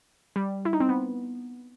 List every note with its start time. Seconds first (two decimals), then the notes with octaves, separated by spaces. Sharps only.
0.36 G3
0.65 E4
0.73 D#4
0.80 C4
0.89 B3